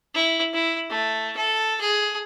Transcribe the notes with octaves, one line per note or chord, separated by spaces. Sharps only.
E4
E4
A3
A4
G#4